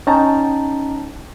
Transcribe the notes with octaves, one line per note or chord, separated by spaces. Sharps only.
C#4 D#4 G5 A5 A#5